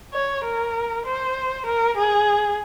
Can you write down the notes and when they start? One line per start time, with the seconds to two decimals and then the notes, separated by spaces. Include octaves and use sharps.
0.14 C#5
0.44 A#4
1.05 C5
1.66 A#4
1.97 G#4